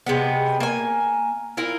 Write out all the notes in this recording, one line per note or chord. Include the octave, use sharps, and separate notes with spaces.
C3 G#3 B3
A#3 G#5
E4 F4 A#4